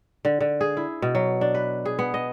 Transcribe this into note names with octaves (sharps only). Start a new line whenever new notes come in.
D3
D3
G#4
E4
B2
F#3
D4
B4
G#4
B3
D#5